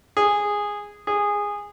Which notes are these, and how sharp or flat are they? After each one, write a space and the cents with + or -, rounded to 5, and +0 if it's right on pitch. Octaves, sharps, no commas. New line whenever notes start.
G#4 -10
G#4 -15